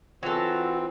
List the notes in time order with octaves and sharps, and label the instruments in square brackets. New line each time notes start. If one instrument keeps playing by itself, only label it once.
[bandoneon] E3 C4 [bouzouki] F#3 A4 [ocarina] F4